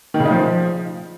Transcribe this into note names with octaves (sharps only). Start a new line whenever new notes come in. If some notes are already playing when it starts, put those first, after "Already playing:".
D#3
C#3
D#4
F3